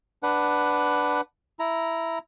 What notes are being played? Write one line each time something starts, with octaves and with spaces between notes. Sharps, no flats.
D4 B4 F#5
E4 A#5